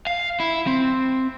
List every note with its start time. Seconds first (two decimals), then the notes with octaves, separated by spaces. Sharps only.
0.07 F5
0.40 E4
0.67 C4